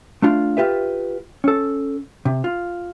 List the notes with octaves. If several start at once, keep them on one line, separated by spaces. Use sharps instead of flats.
A3 D4 F4
F4 G4 B4 E5
C#4 A4
C3
F4